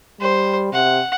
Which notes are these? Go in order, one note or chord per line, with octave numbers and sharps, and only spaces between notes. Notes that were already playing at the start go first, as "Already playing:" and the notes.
G3 C5
C3 F#5